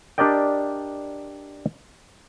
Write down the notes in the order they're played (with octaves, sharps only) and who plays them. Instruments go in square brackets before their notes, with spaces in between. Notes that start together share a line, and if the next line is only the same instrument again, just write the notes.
[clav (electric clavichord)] D4 G4 A#4 D5 D#5 G5